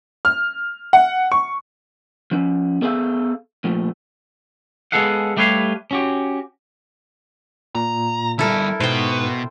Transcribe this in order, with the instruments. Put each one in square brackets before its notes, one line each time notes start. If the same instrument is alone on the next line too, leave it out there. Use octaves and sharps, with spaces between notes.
[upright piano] F6
F#5
C#6
[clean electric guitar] F3 C#4
B3 G#4 A4 C#5 E5 F5
A#2 F3 A3
G#3 B3 G#4 A4 F5 F#5
G3 A3 G4 B4 C#5 F5
C#4 F#4 G4
[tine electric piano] A#2 [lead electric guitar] A#5
[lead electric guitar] D3 G3 [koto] E4 A4 A#4
[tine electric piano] G#2 [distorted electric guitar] B2 [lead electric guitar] B4 [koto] C5 G5